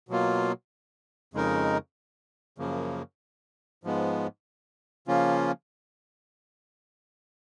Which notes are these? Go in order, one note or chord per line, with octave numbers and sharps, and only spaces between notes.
B2 F#3 A#3 F4
F2 C#3 G#3 D#4 A#4
F#2 C#3 F3 A#3
G#2 F3 G#3 B3
C#3 F3 A#3 C#4 F4